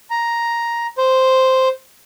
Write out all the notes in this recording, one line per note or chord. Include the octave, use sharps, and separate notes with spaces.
A#5
C5